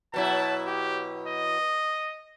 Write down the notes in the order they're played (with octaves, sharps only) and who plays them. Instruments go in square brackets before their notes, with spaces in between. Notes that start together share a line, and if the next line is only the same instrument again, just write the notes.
[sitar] B2 F#3 E4 [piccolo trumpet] A5
[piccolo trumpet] G4
D#5